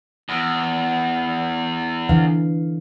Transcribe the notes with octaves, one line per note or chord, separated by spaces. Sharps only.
E2
D3 E3 F5